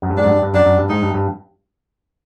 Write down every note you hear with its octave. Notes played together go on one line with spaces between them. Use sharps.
F#2
G2
G#2 D4
F#2
G2
G2
F#2 D4
F#2
G2
G#2 D#4
G2
G2